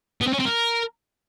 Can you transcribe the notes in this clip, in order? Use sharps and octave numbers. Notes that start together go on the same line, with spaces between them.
B3
C4
C#4
C4
A#4